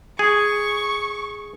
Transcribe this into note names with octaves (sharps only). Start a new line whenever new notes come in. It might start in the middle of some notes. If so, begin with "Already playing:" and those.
G#4 C#6